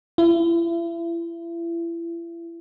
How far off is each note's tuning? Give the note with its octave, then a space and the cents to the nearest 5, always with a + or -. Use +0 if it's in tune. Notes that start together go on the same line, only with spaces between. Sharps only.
E4 +35